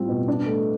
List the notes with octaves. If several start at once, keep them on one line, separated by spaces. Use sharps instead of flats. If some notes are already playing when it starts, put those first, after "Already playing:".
Already playing: A2 G3 C4 F4
B2
D4
A3